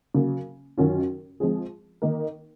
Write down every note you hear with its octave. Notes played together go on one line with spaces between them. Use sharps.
C#3 F#3 A#3
F#2 D#3 F#3 C#4 F4
F3 G#3 C4 F4 G#4
D#3 A#3 D#4 A#4